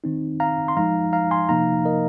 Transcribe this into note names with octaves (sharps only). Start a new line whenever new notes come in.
D#3 C4 D#4
F5 A#5
C6
F3 G#3 D#4 F5 A#5
F5 A#5
G#5 C6
C3 F3 A#3 D#4 F5 A#5
A#4 D#5